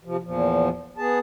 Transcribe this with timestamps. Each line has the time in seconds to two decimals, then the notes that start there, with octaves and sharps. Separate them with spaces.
0.05 C3 F3
0.23 E2 A#2 F3
0.98 B3 G#4 A5